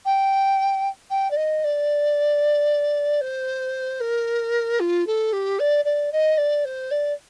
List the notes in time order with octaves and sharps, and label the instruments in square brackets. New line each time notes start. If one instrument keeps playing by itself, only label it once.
[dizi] G5
G5
D5
D#5
D5
C5
A#4
F4
A4
G4
D5
D5
D#5
D5
C5
D5